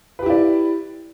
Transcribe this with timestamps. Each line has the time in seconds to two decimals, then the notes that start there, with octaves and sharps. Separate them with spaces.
0.19 B4
0.22 G4
0.26 E4
0.30 D5